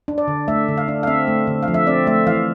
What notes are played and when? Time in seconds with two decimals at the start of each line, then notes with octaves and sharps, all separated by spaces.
0.08 D4
0.18 D5
0.28 D3
0.48 A3 E5
0.68 D3
0.78 F5
0.88 D4
1.03 F5
1.07 C4 E5
1.27 A3
1.47 D3
1.63 F5
1.68 F3
1.74 E5
1.87 C4 D5
2.07 A3 E5
2.27 E3 F5